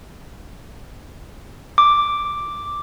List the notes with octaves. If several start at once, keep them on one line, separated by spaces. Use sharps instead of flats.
D6